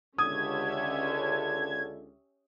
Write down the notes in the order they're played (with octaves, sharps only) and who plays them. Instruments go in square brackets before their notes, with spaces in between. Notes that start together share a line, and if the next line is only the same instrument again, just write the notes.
[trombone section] C#2 D3 [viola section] C#4 G4 E5 [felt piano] D#6 [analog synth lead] G#6